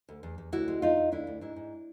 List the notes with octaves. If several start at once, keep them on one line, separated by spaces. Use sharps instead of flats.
D2
E2
E2
D2 E4 F#4
G#3
E2 D#4 F4
E2
D2 D4 E4
D2
G#2 D4 E4
G#2